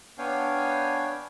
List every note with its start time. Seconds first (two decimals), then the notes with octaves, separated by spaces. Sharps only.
0.18 B3 D4 C#5 F5 G5 G#5